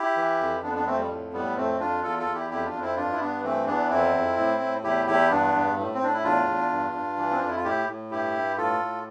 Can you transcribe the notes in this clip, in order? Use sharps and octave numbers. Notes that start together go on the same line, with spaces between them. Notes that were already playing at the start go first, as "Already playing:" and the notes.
Already playing: E4 G4
E3
F2
F2 B3 D4
B3 D4
F2 A3 C4
G3
A2
A2 G3 B3
F2 A3 C4
F2 D4 F4
E2 F4 A4
F4 A4
E2
E4 G4
F2 E4 G4
D4 F4
F2
C4 E4
G2 D4 F4
E4
G2 B3 D4
E3 A3 C4
E2 B3 D4
F2 C4 E4
F2
A2
A2
E2 E4 G4
E2 E4 G4
G2 B3 D4
G2
A2
C4
A2 D4
E4
E2 D4 F4
E2
G2
G2
E3
C4
F2 D4
E4
F4
A2 E4 G4
A2
G2 E4 G4
G2
A2 F4 A4
A2